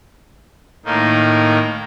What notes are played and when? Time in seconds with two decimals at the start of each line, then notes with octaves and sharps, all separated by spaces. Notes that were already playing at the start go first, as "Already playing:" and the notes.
0.85 A2 D#3 A#3 D#4